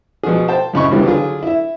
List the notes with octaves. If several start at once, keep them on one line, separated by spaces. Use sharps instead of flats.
B2 F3 F#4 G#4
C5 G5 A5
F#2 A2 C#3 D#5 B5 C#6
G#1 C#3 E3 F#3 G3 B3
D3 F#3 F4 G#4
E4 E5